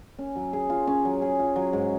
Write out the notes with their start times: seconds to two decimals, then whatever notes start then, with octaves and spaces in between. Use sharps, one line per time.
0.19 C#4
0.36 F#3
0.53 G#4
0.70 F4
0.87 C#4
1.05 F#3
1.22 G#4
1.39 F4
1.56 F#3
1.73 G#2